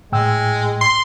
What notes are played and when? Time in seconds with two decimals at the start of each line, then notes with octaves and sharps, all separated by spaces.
0.12 A2 G#3 G5 E6
0.81 C6